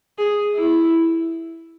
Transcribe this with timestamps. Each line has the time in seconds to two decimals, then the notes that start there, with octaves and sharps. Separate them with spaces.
0.18 G#4
0.55 E4